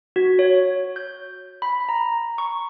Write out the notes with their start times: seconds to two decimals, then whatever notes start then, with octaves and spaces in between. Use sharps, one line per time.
0.16 F#4
0.39 C#5
0.96 G6
1.62 B5
1.89 A#5
2.38 C#6